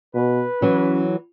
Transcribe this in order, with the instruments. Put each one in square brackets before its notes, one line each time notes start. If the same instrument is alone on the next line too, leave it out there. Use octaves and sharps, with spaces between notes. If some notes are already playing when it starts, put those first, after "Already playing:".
[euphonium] B2 [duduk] B4
[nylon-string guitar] E3 F#3 [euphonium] C#4